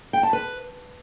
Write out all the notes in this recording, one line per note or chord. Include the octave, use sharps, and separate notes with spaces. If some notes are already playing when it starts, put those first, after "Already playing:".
G5
A5
B4